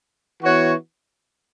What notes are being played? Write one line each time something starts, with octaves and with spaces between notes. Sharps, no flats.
E3 B3 F#4 C#5